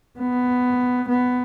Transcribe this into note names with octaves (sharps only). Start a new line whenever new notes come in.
B3
B3